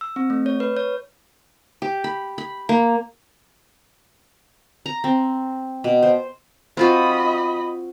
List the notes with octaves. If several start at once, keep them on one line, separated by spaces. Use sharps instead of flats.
E6
C4
A3
C#5
B4
C#5
G4
B5
B5
A#3
A#5
C4
B2
C5
C4 F4 F#4 D#5 B5